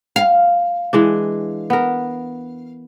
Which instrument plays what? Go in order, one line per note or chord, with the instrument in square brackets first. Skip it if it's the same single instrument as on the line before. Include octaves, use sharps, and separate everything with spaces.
[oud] F5
[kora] E3 G#3 D4
B3 A#4